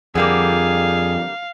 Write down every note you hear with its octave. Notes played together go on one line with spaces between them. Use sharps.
F2 D3 G3 A#3 G#4 F5